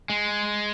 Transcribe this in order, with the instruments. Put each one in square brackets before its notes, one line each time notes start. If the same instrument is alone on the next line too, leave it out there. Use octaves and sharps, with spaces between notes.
[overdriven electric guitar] G#3